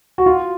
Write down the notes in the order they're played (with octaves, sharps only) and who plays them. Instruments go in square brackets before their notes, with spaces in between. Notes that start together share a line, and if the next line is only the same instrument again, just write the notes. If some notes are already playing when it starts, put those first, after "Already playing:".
[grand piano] F#4
F4